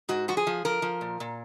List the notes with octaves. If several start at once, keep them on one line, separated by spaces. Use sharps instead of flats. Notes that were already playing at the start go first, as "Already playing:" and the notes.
G#2 F#4
F3 F#4
G#4
F3
F3 A#4
F3
A#2
A#2